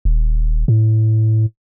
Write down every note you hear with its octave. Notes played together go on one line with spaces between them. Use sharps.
D#1
A2